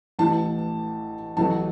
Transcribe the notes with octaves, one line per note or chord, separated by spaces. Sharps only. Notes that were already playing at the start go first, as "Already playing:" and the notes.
A1 A2 E3 A5
A1 A2 F#3 A3 A5